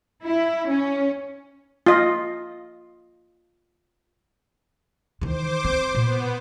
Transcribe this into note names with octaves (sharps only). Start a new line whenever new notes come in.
E4
C#4
F4 D#5
D#3 E3 C5 D6
C4
A#2 B3